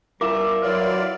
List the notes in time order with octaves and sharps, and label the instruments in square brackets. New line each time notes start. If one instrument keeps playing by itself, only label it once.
[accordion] G3 [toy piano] E4 F5 D6 [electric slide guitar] A#4 E5
[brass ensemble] F#3 E4 [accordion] F4 D5 [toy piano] B4